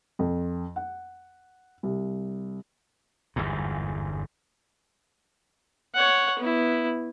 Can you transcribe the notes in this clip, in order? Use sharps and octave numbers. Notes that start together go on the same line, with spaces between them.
F2
F#5
C2
G1 E2 G#2
C#5 F#5
B3 E4